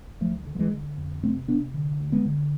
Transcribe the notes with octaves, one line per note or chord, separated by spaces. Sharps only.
D2 F3 A3
D3
F3
E3 G#3
D3
F2
C3 A3 C4
C3 B3 D4
D3
D2
G#3 B3
D3